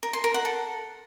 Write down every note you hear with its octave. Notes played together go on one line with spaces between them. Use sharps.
A#4
C6
A#4
F#5
A4